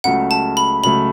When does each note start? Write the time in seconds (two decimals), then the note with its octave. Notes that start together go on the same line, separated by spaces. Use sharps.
0.04 C#2 C#3 F#3 A3 F#5
0.31 A5
0.57 B5
0.83 C#2 C#3 F#3 A3 B5